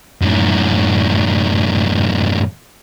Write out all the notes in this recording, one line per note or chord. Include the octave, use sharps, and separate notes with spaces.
F#2 A2